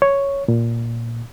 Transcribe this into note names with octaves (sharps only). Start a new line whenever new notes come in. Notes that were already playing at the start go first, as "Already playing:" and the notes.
C#5
A#2